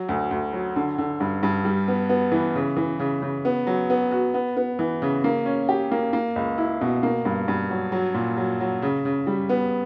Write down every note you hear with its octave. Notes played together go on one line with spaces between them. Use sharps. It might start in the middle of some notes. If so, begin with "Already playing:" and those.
Already playing: F#3
D2
D2
F#3
D3
D3
G2
G2
G3
B3
B3
E3
C#3
E3
C#3
C#3
B3
F#3
B3
F#4
B3
B3
E3
C#3
A#3
C#4
G4
A#3
A#3
C#2
E4
B2
A#3
G2
G2
F#3
F#3
A#2
F#3
F#3
C#3
C#3
G3
B3